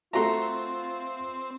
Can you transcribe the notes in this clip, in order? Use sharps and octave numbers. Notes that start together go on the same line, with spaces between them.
A3 C4 F4 F#4 E5 A#5 C6